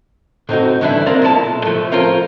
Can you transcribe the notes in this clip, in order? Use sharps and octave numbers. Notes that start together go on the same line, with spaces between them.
A2 C4 D#4 F#4
G2 D3 E3 D4 E4 E5
A#3 C4 A#4 D5 F5
B1 A#2 E4 A4 A5
A2 F3 A3
F4 A4 A#4 C5 C#5 F5